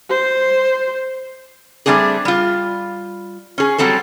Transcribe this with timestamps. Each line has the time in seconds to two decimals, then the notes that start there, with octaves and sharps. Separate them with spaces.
0.10 C5
1.86 G3 A3 C4 D4 G#4
2.25 G3 F4
3.58 C#4 G#4
3.78 F#3 G3 C4 A4 C5